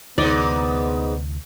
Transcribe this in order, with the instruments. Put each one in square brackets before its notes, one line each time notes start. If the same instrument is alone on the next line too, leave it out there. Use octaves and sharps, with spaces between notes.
[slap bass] D2 C3 E3 [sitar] G#2 D#4 [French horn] B3 [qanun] D5